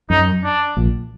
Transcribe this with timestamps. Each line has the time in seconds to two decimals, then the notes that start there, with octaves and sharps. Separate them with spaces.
0.10 F#2 D#4
0.44 D4
0.77 A#1 A#2